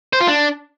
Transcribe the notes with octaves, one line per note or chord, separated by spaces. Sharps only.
C5
F4
D4